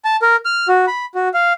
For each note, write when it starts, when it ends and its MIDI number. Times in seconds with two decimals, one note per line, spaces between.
0.05 0.16 81
0.22 0.36 70
0.45 0.67 89
0.68 0.85 66
0.87 1.05 83
1.15 1.28 66
1.34 1.53 77